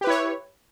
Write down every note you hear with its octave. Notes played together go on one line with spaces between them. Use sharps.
E4 G4 B4 C#5